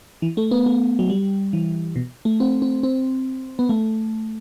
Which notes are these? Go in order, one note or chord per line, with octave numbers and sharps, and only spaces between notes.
E3
A3
B3
A3
F#3
G3
E3
B2
A3
C4
C4
C4
B3
A3